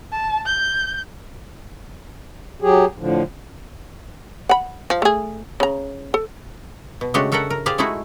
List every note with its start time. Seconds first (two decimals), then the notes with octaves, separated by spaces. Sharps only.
0.12 A5
0.46 G6
2.62 F#3 G4 G#4
2.98 A2 D3 F3
4.49 F#5 B5
4.90 F3
5.02 A3 G#4
5.60 C#3 A#5
6.14 A4
7.01 B2
7.14 C#3 G#3 A3 D4 F#4 G4
7.32 F#4 A4 A#4 E5 F#5 G5
7.50 A#4
7.66 G4 G#4 C5 D5 F5
7.78 G#3 A3 D#4 E4 F#4 G#4